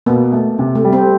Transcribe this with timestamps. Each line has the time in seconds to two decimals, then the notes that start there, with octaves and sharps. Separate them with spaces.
0.06 B2 A#3
0.33 A3
0.59 C3
0.75 A3
0.85 G3
0.93 C4